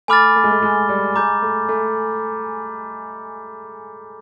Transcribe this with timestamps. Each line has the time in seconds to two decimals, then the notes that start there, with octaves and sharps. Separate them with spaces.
0.08 A3 G#5 B5 D6 F6 A6
0.36 A3
0.44 G#3
0.51 A3
0.62 G#3
0.89 G3
1.16 G#3 A#5 D6 G6
1.42 A3
1.69 A3